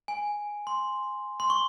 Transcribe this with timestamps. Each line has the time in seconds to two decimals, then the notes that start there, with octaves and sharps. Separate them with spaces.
0.08 G#5
0.67 C6
1.40 C6
1.50 C#6